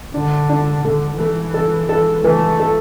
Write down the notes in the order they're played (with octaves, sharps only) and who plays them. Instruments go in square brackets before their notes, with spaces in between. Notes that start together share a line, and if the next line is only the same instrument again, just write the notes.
[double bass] D3 [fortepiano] D4
[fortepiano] D4
[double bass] D3 [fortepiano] A3
[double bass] E3 [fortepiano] A3
[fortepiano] A4
A4
[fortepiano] E3 [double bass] A3
[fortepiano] A4